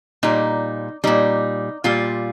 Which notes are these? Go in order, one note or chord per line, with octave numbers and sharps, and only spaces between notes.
A#2 G3 D#4
A#2 G3 D#4
A#2 G3 F4